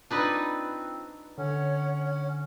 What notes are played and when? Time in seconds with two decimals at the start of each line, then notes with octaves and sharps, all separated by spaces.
0.11 C4 D4 D#4 F4 B4
1.38 D3 C#4 C#5 F#5